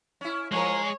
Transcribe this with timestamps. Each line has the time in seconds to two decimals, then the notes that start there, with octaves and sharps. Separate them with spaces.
0.21 C#4 E4
0.52 F3 G#3 G#4 A#4 C#5